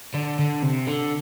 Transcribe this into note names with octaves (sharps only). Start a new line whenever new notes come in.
D3
D3
C3
D3